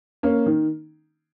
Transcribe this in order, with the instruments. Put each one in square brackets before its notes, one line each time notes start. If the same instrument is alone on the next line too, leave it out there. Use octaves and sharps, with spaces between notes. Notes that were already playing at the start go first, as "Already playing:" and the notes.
[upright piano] A#3 C#4
D#3